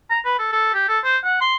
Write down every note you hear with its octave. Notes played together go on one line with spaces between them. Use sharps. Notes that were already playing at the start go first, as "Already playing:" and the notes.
A#5
B4
A4
A4
G4
A4
C5
F#5
C6